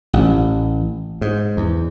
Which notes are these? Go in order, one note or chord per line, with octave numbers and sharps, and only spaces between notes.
A1
G#2
E2